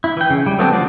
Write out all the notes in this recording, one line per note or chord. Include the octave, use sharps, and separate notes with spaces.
E4
E3 G5
C#3
G3
F#3 A3 B3 C4 D4
D3 F3 D5